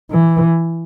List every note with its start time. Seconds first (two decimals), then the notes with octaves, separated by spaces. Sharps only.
0.11 E3